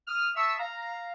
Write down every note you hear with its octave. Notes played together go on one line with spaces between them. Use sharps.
D#6 F6
E5 A5 C#6 D#6 E6
F5 A#5